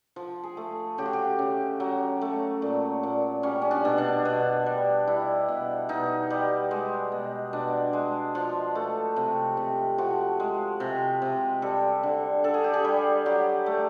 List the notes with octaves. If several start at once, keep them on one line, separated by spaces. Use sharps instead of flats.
F3
G#4
A3
C#3 G4
F#4
G4
C#3
F#3
A3
A#2
A#2
G3 C#4
C#4
D4
B2
D4
B2
G3
G3 E4
B2
B2 D#4
G3
G#3
B2
B2 D4
G#3
F3
A3
C3
C3
F3 F#4
G#3
C3
C3
G3 A4
D3
D3 A4
G#4
G4
G#4
G3
F#3 G4
A3